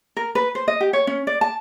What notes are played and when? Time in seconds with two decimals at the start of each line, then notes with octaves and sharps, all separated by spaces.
0.17 A#4
0.35 B4
0.55 C5
0.68 D#5
0.81 G4
0.93 C#5
1.07 C#4
1.27 D5
1.41 A5